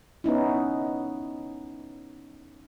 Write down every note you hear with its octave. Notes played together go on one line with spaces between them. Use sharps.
B3 C#4 D#4 E4